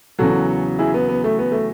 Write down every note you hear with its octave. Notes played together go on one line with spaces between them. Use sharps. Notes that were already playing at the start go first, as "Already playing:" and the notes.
E2 C#3 F#3 F#4 A4
E4 G#4
B3
B3
A3
B3
A3